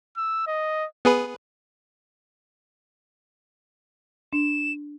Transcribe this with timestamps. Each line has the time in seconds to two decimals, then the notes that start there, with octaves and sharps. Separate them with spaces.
0.17 E6
0.47 D#5
1.05 B3 G#4 B4
4.33 D4 E7